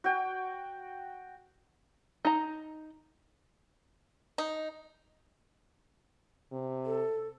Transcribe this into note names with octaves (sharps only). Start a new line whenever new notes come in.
F#4 G5
D#4 A#5
D#4
C3
A4